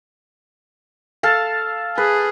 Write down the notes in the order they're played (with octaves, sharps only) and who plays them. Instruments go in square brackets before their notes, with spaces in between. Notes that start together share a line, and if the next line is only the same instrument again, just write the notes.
[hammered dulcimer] A4 F5 A5
[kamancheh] G#4 [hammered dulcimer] B4